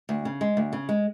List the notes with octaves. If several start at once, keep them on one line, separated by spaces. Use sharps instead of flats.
D2
C#3
G#3
D2
C#3
G#3